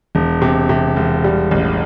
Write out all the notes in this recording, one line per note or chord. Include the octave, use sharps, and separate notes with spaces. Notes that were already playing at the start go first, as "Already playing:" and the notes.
E1
C3
C3
E1
G3
A1